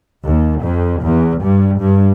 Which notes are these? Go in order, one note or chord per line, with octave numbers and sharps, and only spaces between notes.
D#2
F2
E2
G2
G2